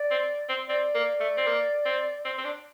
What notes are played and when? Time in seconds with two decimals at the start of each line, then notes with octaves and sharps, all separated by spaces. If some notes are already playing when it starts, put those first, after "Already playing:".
Already playing: D5
0.10 C4
0.49 C4
0.69 C4 D5
0.95 A#3
1.20 A3
1.37 C4
1.47 A#3
1.85 C4
2.25 C4
2.38 C4
2.44 D4